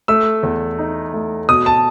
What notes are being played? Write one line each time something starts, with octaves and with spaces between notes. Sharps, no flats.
A3 E6
E2
D#4
A3
B2 D#6
A5